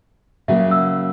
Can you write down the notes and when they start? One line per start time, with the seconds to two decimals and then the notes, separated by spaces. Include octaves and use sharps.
0.48 C#3 F#3 A#3 E5
0.71 E6